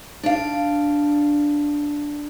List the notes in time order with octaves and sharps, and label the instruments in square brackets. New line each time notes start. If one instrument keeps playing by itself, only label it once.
[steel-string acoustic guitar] D4 F5